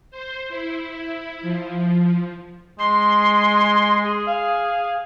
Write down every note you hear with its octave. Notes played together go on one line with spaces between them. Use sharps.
C5
E4
F3
G#3 C6
G#4
F5